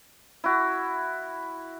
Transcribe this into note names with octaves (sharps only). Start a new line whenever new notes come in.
E4 F#4